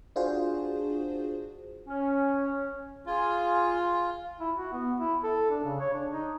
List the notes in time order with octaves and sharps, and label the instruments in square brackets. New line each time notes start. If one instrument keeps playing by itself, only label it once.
[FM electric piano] D4 F4 F#4 G#4 C5
[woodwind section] C#4
[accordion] F4 [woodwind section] G#4 G#5
[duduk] E4
F#4
B3
E4
A4
D4
C#3
C#5
D4
D#4